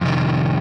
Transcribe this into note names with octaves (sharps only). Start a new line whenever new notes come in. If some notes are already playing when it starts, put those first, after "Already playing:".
F2 C3 D#3